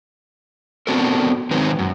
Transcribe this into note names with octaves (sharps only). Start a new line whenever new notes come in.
B3 C4 D4 F#4 A4 A#4
D#3 F#3 G#3 C4 D#4 B4
F#2